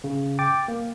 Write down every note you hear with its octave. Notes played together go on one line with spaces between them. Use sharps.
C#3
G5 D6 A6
A#3